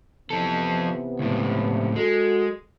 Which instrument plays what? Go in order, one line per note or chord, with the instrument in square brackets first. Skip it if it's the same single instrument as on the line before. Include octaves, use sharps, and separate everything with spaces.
[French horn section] C3 E3 B3 [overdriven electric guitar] F3 A4
[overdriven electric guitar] C#2 A2
[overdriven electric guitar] G#3 [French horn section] F#4 A4